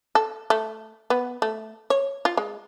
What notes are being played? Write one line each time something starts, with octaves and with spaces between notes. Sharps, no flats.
A4
A3
B3
A3
C#5
F4
G#3